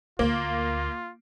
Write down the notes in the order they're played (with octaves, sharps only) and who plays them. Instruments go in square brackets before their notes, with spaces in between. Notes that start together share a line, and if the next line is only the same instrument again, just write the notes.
[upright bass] D2 [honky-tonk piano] A#3 [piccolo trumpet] F4